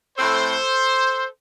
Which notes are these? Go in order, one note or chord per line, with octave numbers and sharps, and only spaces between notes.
A2 A3 C4 A4 C5